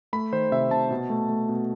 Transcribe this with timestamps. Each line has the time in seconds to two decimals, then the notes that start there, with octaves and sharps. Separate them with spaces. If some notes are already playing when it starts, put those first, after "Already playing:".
0.13 A3 B5
0.32 D#3 C5
0.51 C3 E5
0.71 C3 A5
0.91 B2
1.10 A3
1.29 A3
1.49 B2